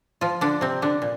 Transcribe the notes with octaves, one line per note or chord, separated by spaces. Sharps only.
F3 F4
D3 D4
C3 C4
D3 D4
A#2